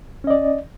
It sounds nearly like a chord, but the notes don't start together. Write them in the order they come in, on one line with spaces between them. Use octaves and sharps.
C#4 D#5 D5